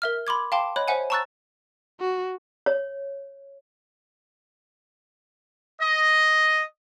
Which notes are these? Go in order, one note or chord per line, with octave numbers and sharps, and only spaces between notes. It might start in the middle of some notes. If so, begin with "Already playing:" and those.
A#4 E5 F6
B5 C6 D6 G#6
F5 G5 A5 C6 D6
C#5 D#5 B5 F#6 G6
C5 C#5 E5 F#5 G#5
A5 A#5 C#6 E6 F#6 A6
F#4
C#5
D#5